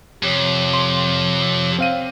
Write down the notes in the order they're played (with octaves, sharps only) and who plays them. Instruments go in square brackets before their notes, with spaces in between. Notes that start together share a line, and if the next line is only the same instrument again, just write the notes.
[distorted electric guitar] F2 [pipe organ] C3 C#5 D6
[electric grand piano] C6
C4 F5 D#7